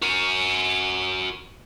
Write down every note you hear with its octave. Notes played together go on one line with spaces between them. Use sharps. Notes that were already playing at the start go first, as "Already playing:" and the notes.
F#4 A#4